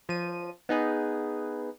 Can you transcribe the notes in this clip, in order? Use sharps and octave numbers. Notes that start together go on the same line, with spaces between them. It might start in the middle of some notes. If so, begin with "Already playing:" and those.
F3 D#7
B3 D#4 G#4 B4